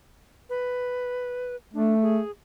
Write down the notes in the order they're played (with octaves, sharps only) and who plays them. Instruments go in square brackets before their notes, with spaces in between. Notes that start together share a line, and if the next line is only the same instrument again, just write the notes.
[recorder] B4
[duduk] A3 [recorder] D4
[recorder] G#4